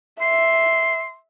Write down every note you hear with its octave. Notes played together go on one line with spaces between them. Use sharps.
E5 C6